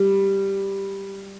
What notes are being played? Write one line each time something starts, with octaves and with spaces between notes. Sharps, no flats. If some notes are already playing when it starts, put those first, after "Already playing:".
Already playing: G3